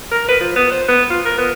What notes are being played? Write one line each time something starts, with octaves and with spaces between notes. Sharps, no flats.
A#4
B4
F3
B3
C5
B3
F4
A#4
B3